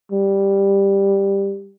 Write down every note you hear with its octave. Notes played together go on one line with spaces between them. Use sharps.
G3